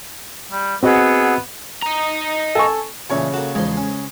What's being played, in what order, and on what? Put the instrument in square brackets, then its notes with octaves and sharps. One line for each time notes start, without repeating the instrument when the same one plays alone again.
[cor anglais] G3
[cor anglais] B3 [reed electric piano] C4 F#4 D#5 [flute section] G#4 F#5 E6
[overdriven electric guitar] D#5 A#5
[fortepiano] A4 G#5 C#6
[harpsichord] A#2 E3 A3 [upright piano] C#3 C#5
[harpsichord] A#3 F#4 [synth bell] A4
[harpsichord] E2 D#3 F3 [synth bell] G#3 C5
[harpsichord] C#4